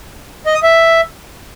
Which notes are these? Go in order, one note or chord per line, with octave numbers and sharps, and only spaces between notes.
D#5
D#6
E5